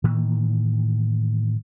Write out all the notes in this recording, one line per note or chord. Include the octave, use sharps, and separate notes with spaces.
A2 D#3 E3 A#3